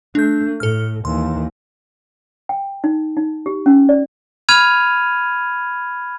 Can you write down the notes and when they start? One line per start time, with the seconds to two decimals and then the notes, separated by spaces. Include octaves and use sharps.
0.15 A3 D4 G6
0.60 A2 A4 F6
1.05 D#2 E3 C6
2.49 G5
2.84 D#4
3.17 D#4
3.46 G4
3.66 C#4
3.89 D5
4.49 B5 F6 G#6 D#7 F7